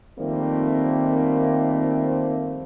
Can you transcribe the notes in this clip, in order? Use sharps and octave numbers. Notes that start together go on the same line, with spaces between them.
F2 D#3 G3 A3 A#3 C4